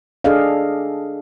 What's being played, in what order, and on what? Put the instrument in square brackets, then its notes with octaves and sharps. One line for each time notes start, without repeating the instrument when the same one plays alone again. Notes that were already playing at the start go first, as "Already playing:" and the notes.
[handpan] D4 G#4 A4 D5 D#5 F5